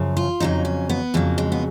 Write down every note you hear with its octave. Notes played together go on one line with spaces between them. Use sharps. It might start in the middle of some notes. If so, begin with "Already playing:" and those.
Already playing: F#2 C#3 F3
F4
F2 C#3 F#3 D#4
C#4
B3
F2 C#3 F#3 A#3
G#3
B3